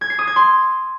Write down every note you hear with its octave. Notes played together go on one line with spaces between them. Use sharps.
G#6
C7
D#6
G#6
C6